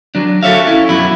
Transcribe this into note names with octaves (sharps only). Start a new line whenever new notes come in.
F#3 D4
F#4 A4 B4 C#5 E5 F5
C#4 E4
F#2 B2 F#3 E4